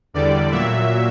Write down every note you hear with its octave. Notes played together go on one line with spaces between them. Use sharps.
E2 D3 G3 D5
A#2 F#3 E5